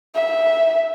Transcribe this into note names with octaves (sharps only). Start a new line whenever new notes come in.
E5